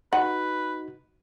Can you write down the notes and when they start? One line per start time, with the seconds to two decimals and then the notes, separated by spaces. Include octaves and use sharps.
0.13 D#4 F#4 B4 F#5